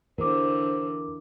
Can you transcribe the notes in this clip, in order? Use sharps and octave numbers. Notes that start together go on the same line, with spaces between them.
E2 D3 E3 A#4 C5 D6